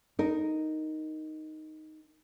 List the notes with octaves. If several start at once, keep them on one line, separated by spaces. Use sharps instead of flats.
D#4 A#4